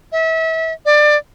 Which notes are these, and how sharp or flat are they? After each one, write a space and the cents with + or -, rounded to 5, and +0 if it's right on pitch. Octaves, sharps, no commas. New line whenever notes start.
E5 -30
D5 +20